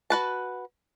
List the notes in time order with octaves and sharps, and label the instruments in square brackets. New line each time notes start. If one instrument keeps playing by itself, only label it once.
[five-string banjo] F#4 B4 A5